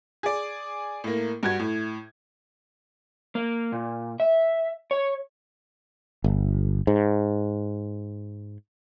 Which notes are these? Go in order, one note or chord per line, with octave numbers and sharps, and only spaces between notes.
G#4 D5
A2 A#3
G2 F#4 G#6
A2
A#3
A#2
E5
C#5
G1
G#2